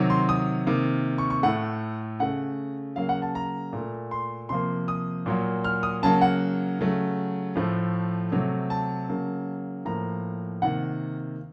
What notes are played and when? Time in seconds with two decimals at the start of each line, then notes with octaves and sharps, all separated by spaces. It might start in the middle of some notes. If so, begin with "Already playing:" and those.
Already playing: C3 D#3 F#3
0.10 C6
0.29 D#6
0.67 C3 D#3 A#3
1.18 C#6
1.30 C#6
1.43 A2 A3 F#5
2.20 C#3 A3 F#5
2.96 C#3 F#3 A#3 F5
3.09 F#5
3.22 A5
3.35 A#5
3.73 A#2 A3
4.11 C6
4.49 C3 F3 A#3 C6
4.88 D#6
5.26 A#2 F#3 A#3
5.64 F6
5.83 D#6
6.02 C#3 F#3 A#3 A5
6.21 F#5
6.79 C#3 F#3 A3
7.55 A2 F3 A3
8.32 C3 F#3 A3
8.70 A5
9.09 C#3 F#3 A#3
9.85 A2 F3 A#3 A#5
10.62 C3 D#3 A#3 F#5